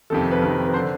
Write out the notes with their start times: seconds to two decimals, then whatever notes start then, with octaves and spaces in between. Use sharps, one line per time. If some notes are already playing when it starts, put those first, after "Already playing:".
0.10 F2 C3 D#3 A4
0.31 B4
0.42 F2 C3 D#3 A#4
0.68 B4
0.74 D3 C5